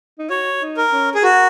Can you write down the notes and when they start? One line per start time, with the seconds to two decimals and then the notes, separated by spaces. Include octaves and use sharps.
0.19 D#4
0.30 F#4 C#5
0.62 D#4
0.77 A#4
0.92 C#4
1.15 G#4
1.23 F#4 A#4